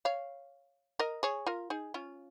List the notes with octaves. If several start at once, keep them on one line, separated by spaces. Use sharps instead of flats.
C#5 F5
A#4 D#5
G#4 C#5
F4 A#4
D#4 G#4
C#4 F4